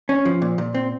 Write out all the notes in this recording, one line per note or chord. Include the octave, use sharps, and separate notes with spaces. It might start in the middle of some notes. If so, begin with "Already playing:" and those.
C#4
F3
A#2
A#2
C4